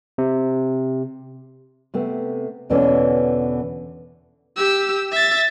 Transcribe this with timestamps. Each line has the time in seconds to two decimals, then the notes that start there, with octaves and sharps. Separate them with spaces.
0.18 C3
1.94 C3 A3 B3
2.70 E2 B2 D3 E3 C#4 D4
4.56 G4 E6
5.12 E5 A6